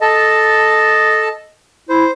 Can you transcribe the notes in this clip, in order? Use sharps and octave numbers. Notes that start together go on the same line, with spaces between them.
A4 D#5 A5
E4 C5